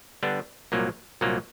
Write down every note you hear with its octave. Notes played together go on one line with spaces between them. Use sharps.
D3 G3 B3 D4
C2 A#2 F#3 A#3
C2 A#2 F#3 A#3